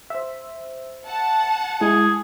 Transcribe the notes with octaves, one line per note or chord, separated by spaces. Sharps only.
C5 E5
F#5 A5
G#3 E4 G#4